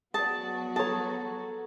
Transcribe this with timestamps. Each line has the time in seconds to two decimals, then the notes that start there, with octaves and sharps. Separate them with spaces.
0.14 F#3 B3 F#4 G#4 D5 A5
0.76 G#4 A4 C#5 A5 A#5